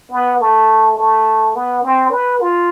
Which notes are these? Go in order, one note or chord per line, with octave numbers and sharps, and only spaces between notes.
B3
A3
A3
B3
C4
B4
F4